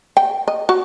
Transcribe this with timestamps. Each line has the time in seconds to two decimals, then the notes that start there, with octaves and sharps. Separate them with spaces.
0.17 G5
0.48 D#5
0.69 F#4